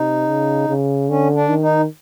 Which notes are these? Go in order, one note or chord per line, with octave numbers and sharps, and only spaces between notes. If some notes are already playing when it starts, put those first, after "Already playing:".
Already playing: C3 D#4
C#3
C#3
D3 C#4
D4
D#3
D#4